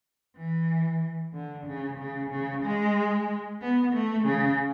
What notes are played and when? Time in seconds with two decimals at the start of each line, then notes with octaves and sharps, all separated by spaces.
0.37 E3
1.33 D3
1.67 C#3
1.99 C#3
2.31 C#3
2.63 G#3
3.61 B3
3.94 A3
4.25 C#3